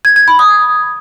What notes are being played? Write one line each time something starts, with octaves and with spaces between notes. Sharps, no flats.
G#6
G#6
B5
D#6